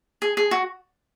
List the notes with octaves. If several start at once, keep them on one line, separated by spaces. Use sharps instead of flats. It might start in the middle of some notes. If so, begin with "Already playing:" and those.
G#4
G#4
F#4